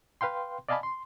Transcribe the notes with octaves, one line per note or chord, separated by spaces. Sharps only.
B4 F5 G5 C6
D5 D#5 F5 G#5 A5 B5
C6